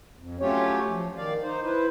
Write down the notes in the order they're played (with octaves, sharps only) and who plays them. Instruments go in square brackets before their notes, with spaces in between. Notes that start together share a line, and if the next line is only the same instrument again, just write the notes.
[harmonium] F2
F#3 A3 C#4 F4 G4 C#5
F3
D#3 D5 F5
D#4 C5
E4 B4 C5